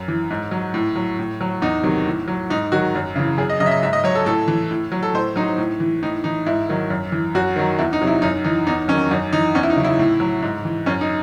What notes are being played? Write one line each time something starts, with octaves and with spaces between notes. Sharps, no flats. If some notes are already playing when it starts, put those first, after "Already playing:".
Already playing: F#2
E3
G#2
F#3
A2
F#3
A2
F#3
E2 D#4
C3 D#3 F#3
A2
F#3
G#2 D#4
D#3 F#3 F#4
F#2
C#3 E3
F#2 G#4
D#5
C#3 F#3 D#5
E5
D#5
G#2 E5
D#5
F#3 C#5
A4
A2 A4
E3
A2
F#3
A4
A2 C5
F#3 D#4
A2
E3
A2 D#4
E3 D#4
G#2 E4
D#3 F#3
F#2
E3
F#2 F#4
D#3 F#3
E2 E4
D#4
C3 F#3
E4
F#2 D#4
E3 D#4
E2 D#4
D#3 F#3 C#4
F#2 D#4
E3 D#4
E2 C#4
E4
D#4
C#3 F#3
E4
A2
F#3
G#2
E3
F#2 C#4
D#4